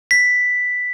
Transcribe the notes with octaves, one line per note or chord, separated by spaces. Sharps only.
B6